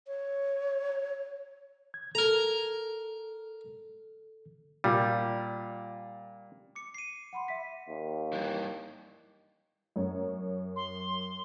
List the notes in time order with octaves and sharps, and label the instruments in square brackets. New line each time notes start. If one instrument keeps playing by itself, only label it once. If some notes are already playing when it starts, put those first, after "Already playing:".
[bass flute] C#5
[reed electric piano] G#6
[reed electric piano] A4 [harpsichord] A#4 A#5
[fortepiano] A#2 [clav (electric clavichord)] G3
[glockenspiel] D6 C#7
C7 D#7
[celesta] F#5 B5 C6
E5 B6
[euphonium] D#2
[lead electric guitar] G2 E3
[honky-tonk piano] F#2 C#5
[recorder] C6